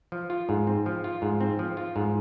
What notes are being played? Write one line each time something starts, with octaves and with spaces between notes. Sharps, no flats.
F3
F4
G#2
C4
F3
F4
G#2
C4
F3
F4
G#2